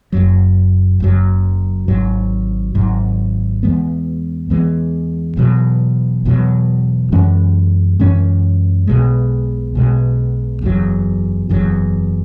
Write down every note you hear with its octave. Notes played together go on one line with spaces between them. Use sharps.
F#1 F#2 F#3
F#1 F#2 F#3
G#1 G#2 F#3
G#1 G#2 F#3
E2 E3 G#3 B3
E2 E3 G#3 B3
E1 E2 B2 F#3
E1 E2 B2 F#3
F#2 E3 G#3 C#4
F#2 E3 G#3 C#4
B1 B2 G#3
B1 B2 G#3
F#1 E2 C#3 F#3
F#1 E2 C#3 F#3